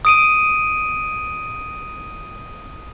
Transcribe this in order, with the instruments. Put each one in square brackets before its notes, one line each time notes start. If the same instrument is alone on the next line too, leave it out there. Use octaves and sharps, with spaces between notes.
[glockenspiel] D#6 D7 D#7